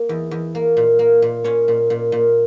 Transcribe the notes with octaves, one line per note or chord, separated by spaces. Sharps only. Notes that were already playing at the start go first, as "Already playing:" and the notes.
Already playing: A#3
E2
E2
A#3
A#2
A#3
A#2
A#2 C#4 C#5
A#2
A#2
A#2